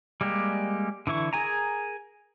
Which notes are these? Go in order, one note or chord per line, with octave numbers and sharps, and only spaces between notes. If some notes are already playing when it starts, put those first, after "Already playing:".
G3 G#3 A#3 G4
D3 E3 E4 C#6
G#4 A#4 G#5 A#5